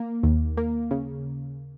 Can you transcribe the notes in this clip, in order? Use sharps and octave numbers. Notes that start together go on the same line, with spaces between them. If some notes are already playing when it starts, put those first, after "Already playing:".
Already playing: A#3
D#2
A#3
C#3